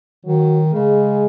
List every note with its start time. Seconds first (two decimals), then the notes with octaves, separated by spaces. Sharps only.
0.25 D#3 F#3
0.73 C#3 G#3